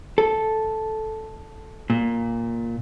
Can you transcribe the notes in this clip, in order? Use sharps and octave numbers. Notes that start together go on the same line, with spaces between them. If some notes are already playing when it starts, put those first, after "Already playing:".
A4
A#2